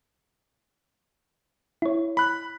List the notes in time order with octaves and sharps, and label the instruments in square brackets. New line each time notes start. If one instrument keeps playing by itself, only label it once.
[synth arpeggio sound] E4 C#5
[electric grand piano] B5 F#6